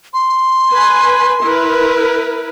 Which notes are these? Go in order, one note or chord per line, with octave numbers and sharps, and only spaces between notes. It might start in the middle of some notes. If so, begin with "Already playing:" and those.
C6
B4 G#5
E4 A#4 B4